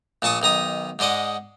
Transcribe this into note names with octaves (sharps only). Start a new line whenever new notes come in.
A#1 A#2 A5 C#6 D#6
B1 D#3 A#5 D#6
G#2 G#3 D5 D#5 F#5